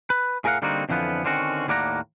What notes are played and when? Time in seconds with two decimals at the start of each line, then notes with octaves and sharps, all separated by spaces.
0.10 B4
0.44 A2 G#4 A#4 D#5 F5 F#5
0.62 D3 G3 A#3 C4 D#4 F#4
0.89 F2 D3 E3 F3 B3
1.25 D3 D#3 C4 C#4 F#4
1.68 D#2 A2 A#3 D5 F#5 A#5